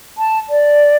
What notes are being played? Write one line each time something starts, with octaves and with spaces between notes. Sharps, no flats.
A5
D5